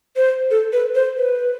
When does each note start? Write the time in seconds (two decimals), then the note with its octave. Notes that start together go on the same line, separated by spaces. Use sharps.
0.16 C5
0.51 A4
0.73 B4
0.95 C5
1.18 B4